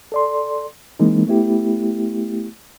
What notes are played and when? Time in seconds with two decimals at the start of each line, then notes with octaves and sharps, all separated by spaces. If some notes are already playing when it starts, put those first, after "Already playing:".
0.12 A4 D5 C6
0.99 E3 G#3 A#3 C4 D#4
1.27 A3 B3 E4 G4